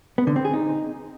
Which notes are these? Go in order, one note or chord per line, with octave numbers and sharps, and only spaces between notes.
B3
D3
C4
G#4
D#4